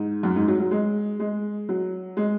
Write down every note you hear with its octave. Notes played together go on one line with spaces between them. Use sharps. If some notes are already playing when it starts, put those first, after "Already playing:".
Already playing: G#2
F#2
G#2
F#3
F#3
G#3
G#3
F#3
G#3